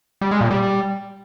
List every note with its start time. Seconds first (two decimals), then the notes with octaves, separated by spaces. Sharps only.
0.21 G3
0.31 G#3
0.41 A#2
0.51 G3